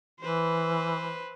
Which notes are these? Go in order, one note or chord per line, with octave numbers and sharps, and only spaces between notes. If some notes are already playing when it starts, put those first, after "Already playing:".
E3 B4 C5